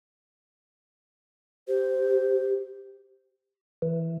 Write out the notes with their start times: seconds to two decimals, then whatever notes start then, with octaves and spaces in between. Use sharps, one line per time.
1.68 G4 C5
3.82 E3